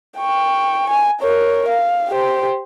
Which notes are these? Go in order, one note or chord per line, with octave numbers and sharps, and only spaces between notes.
G5 C#6
G#5
A#4 C#5
F5
G4 C5